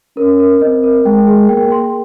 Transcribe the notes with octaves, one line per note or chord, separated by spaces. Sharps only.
C#4 A#4
A#4
C4 D#5
A#4
G#3 G5
G#4
A#3 G5
C6